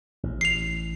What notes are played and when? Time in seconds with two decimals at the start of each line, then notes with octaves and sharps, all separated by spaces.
0.23 A1
0.41 C7 F7